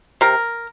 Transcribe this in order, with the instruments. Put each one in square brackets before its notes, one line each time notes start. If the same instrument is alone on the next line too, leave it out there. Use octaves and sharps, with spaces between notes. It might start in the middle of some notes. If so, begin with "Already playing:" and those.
[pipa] C3 A#4